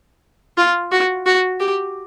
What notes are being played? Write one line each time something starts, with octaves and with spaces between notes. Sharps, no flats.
F4
F#4
F#4
G4